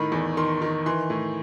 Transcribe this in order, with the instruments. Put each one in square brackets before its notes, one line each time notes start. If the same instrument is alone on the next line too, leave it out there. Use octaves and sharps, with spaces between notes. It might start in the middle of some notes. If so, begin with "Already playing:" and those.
Already playing: [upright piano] A2 D#3 B5
E2
D#3 C6
D#3
E3 C6
A2